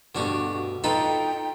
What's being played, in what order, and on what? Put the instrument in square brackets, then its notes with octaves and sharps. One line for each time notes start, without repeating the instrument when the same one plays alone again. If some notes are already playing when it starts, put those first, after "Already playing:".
[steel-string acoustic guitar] D2 G2 B2 [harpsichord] D3 F#4 G4
[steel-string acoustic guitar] D#4 [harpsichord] F4 A4 B4 [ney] G5